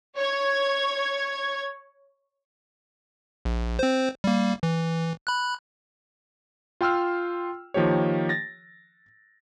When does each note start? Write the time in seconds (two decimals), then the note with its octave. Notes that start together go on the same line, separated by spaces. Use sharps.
0.17 C#5 G#6
3.45 A#1
3.79 C4 C5
4.24 G3 A#3
4.63 E3
5.27 B5 F#6
6.81 F4 G5 C6 E6 F6
7.74 D#3 F3 A#3 G4 C#5
8.29 A6 A#6